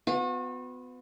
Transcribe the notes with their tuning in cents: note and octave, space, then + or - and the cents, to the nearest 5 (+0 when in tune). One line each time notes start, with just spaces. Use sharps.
B3 +30 F#4 -40